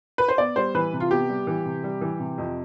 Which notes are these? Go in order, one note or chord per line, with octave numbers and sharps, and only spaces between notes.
B4
C5
B3 D5
G3 C5
E3 B4
C3
F4
B3 G4
G3
E3
C3
G3
E3
C3
F2